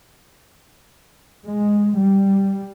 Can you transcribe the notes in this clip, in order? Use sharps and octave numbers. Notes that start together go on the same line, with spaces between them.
G#3
G3